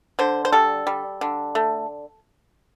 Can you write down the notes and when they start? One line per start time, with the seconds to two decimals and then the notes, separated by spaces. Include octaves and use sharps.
0.19 D3 C5
0.45 C5
0.52 G3 A4
0.87 G3
1.21 D3
1.55 A3